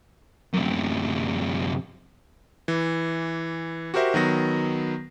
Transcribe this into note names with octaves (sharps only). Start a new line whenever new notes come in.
F#2 C3
E3
F#4 G4 A#4 C5 E5
D#3 F#3 B3 A#6